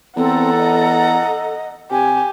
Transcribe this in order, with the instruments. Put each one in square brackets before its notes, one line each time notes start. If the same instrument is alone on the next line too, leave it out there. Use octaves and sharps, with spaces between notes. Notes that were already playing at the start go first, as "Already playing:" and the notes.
[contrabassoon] E2 [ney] C4 [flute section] A4 [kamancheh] F#5 A#5
[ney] D#5
[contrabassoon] C3 [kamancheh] G4 [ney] G#5